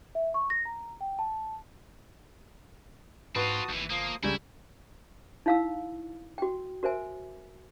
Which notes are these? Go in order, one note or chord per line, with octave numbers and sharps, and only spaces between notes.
E5
C#6
A#6
A#5
G5
A5
G#2 C4 F4 F#4 B4 A5 D#6
G#1 D#2 E3
G1 F3 A#3 D#6
C#2 C#3 G3 E4 G5 G#5 A#5
D#4 E4 F5 A#5 E6
F#4 G5
F#4 A#4 C5 E5 G#5